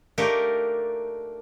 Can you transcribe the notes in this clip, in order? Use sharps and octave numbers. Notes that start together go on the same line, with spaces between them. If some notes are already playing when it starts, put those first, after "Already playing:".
A3 A#3 D4 D#4 G4 A#4